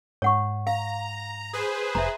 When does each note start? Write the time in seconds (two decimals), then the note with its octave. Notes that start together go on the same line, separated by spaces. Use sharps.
0.22 G#2 C#5 F#5 C#6
0.67 F5 A#5
1.53 G#4 B4 C5
1.95 F1 E5 A#5